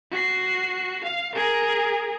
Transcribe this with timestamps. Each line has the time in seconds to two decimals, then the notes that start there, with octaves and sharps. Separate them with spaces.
0.11 F#4 C7
1.04 F5
1.35 G#4 A#4